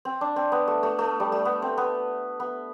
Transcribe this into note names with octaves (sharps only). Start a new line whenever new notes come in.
C4
D4
C4
B3
A3
A3
A3
G3
A3
B3
C4
B3
B3